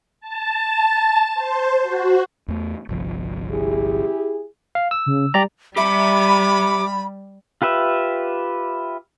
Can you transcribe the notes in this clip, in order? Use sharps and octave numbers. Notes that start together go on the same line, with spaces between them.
A5
C5
F#4
E2 A3
G1 C2 F3
E4 G4 G#4
F5
E6
C#3
G3 G4 D5 A#5
G3 G4 E5 B5 D6
F4 G4 B4 E5